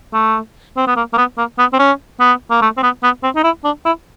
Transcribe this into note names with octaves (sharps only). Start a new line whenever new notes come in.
A3
C4
B3
A#3
A#3
B3
A#3
B3
C4
C#4
B3
A#3
A3
C4
B3
B3
C4
D#4
E4
D4
E4